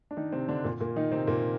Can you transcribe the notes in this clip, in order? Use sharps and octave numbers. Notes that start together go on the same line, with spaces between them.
D4
D#3 D#4
C3 C4
D3 D4
A#2 A#3
A#2 A#3
D#3 D#4
C3 C4
A#2 A#3